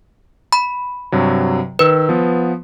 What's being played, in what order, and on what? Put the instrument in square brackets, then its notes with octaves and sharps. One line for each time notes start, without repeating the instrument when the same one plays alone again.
[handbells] B5
[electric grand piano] G2 C3 F#3
[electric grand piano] D#3 E6 [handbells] B4
[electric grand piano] F3 B3